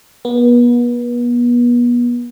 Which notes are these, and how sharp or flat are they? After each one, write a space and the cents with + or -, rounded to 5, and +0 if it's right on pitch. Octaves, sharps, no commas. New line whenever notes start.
B3 -35